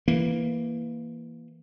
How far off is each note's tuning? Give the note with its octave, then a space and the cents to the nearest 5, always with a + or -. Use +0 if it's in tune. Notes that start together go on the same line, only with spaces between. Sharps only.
E3 +5 A#3 +0